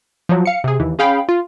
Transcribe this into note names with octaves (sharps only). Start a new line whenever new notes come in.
F3 F#3
F5 C#7
C3 G#4
D#2 E3
C#4 G#4 F5 G5 B5
F4